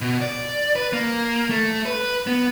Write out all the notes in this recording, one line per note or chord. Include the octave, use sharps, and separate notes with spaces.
B2
D5
B4
A#3
A3
B4
B3